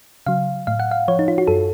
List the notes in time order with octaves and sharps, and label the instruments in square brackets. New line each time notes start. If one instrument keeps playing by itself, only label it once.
[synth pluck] C#3 F#3 F5
A2 F5
F#5
F5
F3 C#5
D#4
F4
F#4
F#2 A4